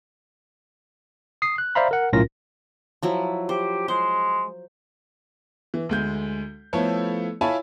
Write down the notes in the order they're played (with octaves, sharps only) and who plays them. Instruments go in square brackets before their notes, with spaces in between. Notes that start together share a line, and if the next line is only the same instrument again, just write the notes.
[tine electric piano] D#6 C7
F#6
C5 D5 E5 F5 A#5 B5
A#4 F#5
B1 A2 C#4 F4 A#4 A#6
[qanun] F3 F#3 E4
[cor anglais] G4 [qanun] C5
[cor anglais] G#3 [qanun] C5
[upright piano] E3
D2 G#3 G6
F3 A3 B3 E4 A4 C#5
E4 F4 C#5 G#5 A5 B5